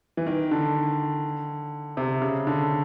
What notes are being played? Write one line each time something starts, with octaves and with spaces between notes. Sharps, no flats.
E3
D#3
D3
C3
C#3
D3